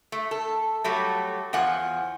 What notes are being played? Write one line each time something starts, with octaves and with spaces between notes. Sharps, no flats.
A3
A4
F#3 G3 A3
E2 F3 F#5 G#5